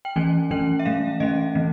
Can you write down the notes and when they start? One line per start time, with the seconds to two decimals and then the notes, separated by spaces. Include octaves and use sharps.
0.05 G5
0.16 E3 A3 C#4 G#5
0.51 E3 A3 C#4 G5
0.79 E5
0.85 E3 A3 C#4 F5
1.20 E3 A3 C#4 D#5
1.55 E3 A3 C4